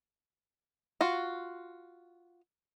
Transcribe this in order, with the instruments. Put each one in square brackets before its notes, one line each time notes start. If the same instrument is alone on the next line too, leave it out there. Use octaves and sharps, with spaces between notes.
[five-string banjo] F4 F#4